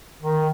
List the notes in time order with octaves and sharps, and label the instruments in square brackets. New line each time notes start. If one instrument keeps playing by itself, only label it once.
[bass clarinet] D#3